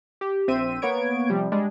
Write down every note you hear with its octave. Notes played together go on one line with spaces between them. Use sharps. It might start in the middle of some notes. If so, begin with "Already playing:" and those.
G4
A#1 C4 C5 E5 G5 D#7
A#3 B3 C#5 G#6 D7
C3 F3 G3
G3 G#3 D4